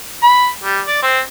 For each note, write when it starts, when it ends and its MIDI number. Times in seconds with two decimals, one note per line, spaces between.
0.23 0.48 83
0.64 0.80 55
0.87 0.99 74
1.02 1.20 60